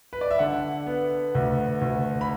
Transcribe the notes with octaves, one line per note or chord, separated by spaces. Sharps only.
B4
D5
E5
D3 F#5
B3
D2
D2
B5